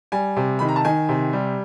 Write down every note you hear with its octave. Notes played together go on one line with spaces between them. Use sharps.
G3 G#5
C3
D#3 B5
A#5
A5
D#3 G#5
C3
G3